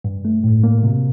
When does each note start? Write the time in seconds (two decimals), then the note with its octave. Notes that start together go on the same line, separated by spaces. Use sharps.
0.04 G2
0.25 A3
0.44 A2
0.64 A#3
0.83 C3